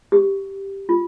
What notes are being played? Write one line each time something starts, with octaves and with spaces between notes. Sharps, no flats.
G4
F4